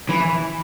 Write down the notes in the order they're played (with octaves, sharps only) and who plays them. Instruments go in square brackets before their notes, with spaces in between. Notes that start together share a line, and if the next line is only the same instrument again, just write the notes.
[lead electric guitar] E3